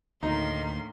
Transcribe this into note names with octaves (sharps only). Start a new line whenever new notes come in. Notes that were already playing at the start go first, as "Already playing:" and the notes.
D2 A2 D#3 A#3 D#4 C6